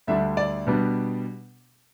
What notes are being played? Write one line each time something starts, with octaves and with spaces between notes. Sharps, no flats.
D2 D3 G3 D4 E5
D5
B2 G3 B3 D4